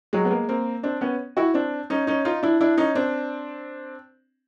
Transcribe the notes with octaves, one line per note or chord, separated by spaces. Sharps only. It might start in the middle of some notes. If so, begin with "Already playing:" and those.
F#3 G#3
B3
G#3 A#3
A#3 C4
C4 D4
B3 C#4
E4 F#4
C4 D4
C#4 D#4
C#4 D#4
D#4 F4
D4 E4
D4 E4
C#4 D#4
C4 D4